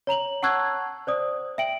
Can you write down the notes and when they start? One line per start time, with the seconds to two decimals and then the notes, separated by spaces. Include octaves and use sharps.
0.07 C#5 A#5 F7 F#7
0.43 F#5 A5 C#6 E6 F#6 G#6
1.07 C5 D5 D#6
1.58 E5 G5 D7 F#7